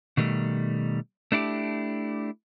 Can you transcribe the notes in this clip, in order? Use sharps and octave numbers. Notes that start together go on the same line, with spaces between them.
B2 D#3 G3 A3
A3 D4 E4 G4